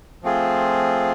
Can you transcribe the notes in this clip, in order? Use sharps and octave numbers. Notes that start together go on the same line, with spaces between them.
F3 A3 C4 F4 G#4